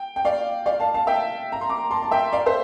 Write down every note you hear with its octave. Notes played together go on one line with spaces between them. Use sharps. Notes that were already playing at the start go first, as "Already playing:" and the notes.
Already playing: G5
G5
D5 F5
D5 F5
F5 A5
F5 A5
E5 G5
A#5
C6
A#5 D6
A5 C6
A5
E5 G5
D5 F5
C5 E5